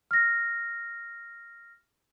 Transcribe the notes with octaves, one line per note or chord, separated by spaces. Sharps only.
F6 A#6